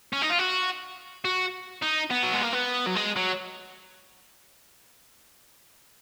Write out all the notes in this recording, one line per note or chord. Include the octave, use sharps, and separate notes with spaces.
C#4
D#4
F4
F#4
F#4
D#4
B3
F#3
G#3
A#3
B3
F#3
G#3
F#3